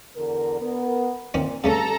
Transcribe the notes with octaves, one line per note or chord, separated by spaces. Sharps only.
E2 D3 A#4
B3 A#4
A#2 D#3 C4 C#4
G2 C#3 A3 C#4 A4 A#5